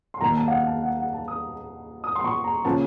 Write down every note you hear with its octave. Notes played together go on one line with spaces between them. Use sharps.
C6
D#2 D#3 A#3 D#4 A#5
A5
F5
F#5
A5
F#5
F#5
A5
D#6
D#6
C6
C#6
A#5
C#3 F3 A#3 C#4 A5